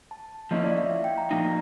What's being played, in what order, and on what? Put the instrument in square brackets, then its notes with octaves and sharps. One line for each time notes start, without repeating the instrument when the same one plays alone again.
[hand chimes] A5
[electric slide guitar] F3 A#3 C#4 E4 [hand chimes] D#5
[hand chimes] D5
E5
F5
G5
A#5
[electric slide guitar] A#2 F3 A#3 D#4 [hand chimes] A#5